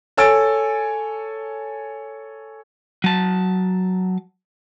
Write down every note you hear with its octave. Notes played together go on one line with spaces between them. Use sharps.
A4 C#5 G#5 E6 A6 D7
F#3 A5